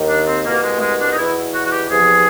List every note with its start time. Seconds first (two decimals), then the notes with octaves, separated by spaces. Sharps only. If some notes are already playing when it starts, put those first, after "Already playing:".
Already playing: D#2 D#3
0.09 D4
0.28 C4
0.46 C2 B2 A#3
0.64 G#3
0.77 A3
0.82 G#3
1.00 D4
1.13 D#4
1.18 E2 B2 E4
1.54 F#4
1.66 F#4
1.72 G4
1.90 E2 C3 F3 G#4